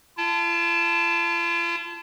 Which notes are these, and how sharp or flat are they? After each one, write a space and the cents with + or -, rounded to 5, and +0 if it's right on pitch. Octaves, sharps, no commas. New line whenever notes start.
F4 -45 A5 +0